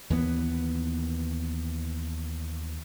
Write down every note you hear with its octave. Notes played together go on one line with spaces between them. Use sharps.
D#2 E3 B3